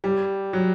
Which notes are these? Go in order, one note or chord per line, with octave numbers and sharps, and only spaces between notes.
G3
F#3